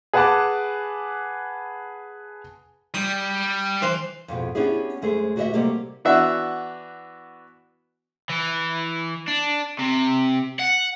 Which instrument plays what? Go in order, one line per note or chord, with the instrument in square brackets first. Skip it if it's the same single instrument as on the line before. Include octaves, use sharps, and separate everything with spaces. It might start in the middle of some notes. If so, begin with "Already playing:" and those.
[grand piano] G#4 B4 F#5 G#5 A5 D6
[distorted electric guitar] G3 [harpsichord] D#6
[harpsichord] E3 C5
[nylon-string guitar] F2 G#2 B2
B3 C#4 D4 E4 G4 G#4
F#2 G#3 A3 G#4 C5
D2 F#4 G4 C5 D#5 E5
C3 F#3 G3 A3 A#3 G4
[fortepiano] E3 B3 D4 F#4 E5
[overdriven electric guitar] E3
D4
C3
F#5